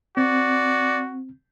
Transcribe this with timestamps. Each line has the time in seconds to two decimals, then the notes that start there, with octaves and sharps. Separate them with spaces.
0.17 C4 F#4 D5